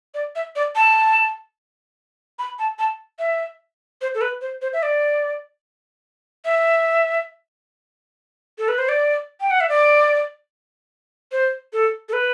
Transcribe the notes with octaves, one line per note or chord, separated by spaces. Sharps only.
D5
E5
D5
A5
B5
A5
A5
E5
C5
A4
B4
C5
C5
E5
D5
E5
A4
B4
C5
D5
G5
F#5
E5
D5
C5
A4
A4
B4